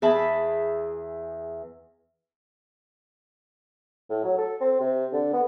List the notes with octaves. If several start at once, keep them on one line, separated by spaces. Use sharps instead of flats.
E2 G#4 E5 A5 B5
A2
F#3
A4
C4
C3
D3
B3